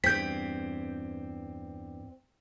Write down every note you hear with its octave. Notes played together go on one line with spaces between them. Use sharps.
E2 G2 C4 G6 B6